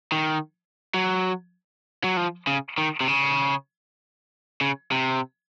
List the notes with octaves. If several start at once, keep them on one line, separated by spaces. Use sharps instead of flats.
D#3
F#3
F#3
F3
C#3
D#3
C3
C#3
C#3
C3